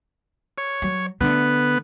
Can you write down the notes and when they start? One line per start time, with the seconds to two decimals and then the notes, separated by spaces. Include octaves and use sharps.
0.58 C#5
0.82 F#3
1.21 D3 A3 B3